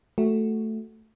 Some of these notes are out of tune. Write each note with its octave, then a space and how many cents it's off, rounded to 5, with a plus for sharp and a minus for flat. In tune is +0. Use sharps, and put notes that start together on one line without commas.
A3 +0 F#4 +0